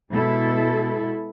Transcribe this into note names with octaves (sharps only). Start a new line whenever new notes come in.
B2 G#3 E4 A4